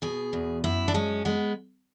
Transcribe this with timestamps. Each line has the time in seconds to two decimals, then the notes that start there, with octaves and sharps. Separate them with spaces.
0.02 B2 G#4
0.33 E2
0.64 F#2 E4
0.88 D4
0.94 G#3 C#4
1.25 G#3 B3